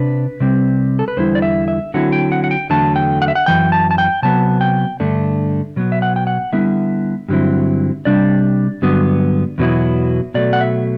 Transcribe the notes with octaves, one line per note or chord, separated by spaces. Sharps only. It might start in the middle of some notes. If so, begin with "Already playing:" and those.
Already playing: C3 D4 B4
C3 G3 C4
A4
B4
E2 D3 G3 E4 C5
D5
E5
E5
D3 F#3 C4 E4 F#5
G5
F#5
F#5
G5
E2 D3 F#3 A3 A5
G5
F#5
E5
F#5
F#2 E3 G5
A5
A5
G5
C3 F#3 B3 A5
G5
G2 D3 A3 D4
B2 F#3 B3
E5
F#5
G5
F#5
D3 G3 B3 E4 E5
G2 D3 F#3 C4 E4
C3 G3 D4 D5
G2 D3 F#3 B3
E2 B2 F#3 B3 E4
B2 F#3 A3 D5
F#5
E5